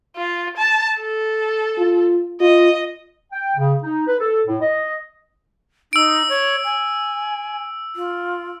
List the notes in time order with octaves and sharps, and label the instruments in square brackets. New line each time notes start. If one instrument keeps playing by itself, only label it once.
[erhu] F4
A5
A4
[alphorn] F4
[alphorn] F4 [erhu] D#5
[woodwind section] G5
C#3
D#4
B4
A4
A2
D#5
[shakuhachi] D#4 [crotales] E6 D7
[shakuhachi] C#5
G#5
F4